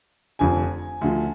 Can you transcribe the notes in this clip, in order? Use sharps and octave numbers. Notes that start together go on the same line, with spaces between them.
F1 F2 D3 F3 G#5
D2 D3 F3